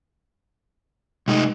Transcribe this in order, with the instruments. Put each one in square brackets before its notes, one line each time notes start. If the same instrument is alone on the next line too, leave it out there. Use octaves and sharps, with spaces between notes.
[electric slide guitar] C3 D#4 [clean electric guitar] G#3 A3